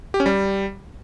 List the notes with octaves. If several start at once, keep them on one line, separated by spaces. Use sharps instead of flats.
G4
C#4
G3